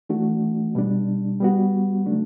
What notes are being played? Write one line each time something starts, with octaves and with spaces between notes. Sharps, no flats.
E3 A3 D4 F#4
B2 G3 D4
G3 B3 F#4
C#3 F#3 A3 D4